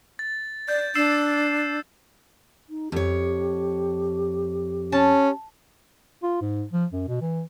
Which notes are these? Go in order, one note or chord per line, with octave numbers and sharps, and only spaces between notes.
A6
D5 G6
D4 E6 C7 E7
D#4
F2 G4 C#5
C#4 A5
F4
G#2
F3
F#2
B2
E3